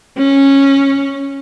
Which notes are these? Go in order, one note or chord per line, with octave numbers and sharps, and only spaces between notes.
C#4